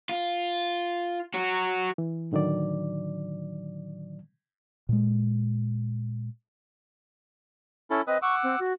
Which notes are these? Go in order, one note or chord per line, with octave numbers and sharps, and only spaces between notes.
F4
F#4 C#5
E3
A2 D3 D#3 F#3 D5
A#2 G#3
C#4 E4 A4
C4 B4 D#5 D#6
F#5 C#6 D6 E6
C4
F#4